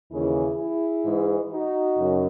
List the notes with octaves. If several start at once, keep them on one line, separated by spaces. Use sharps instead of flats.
D#2 C#3 E3 E4 G#4
E4 G#4
G#2 E3
D#4 F#4
F#2 C#3